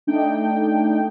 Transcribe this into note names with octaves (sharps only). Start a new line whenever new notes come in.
A3 D4 D#4 G5